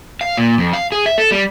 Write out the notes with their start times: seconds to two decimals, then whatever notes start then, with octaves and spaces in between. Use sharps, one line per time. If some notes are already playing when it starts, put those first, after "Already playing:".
0.21 F5
0.37 A#2
0.58 F2
0.73 F5
0.92 G#4
1.06 E5
1.18 A4
1.31 G3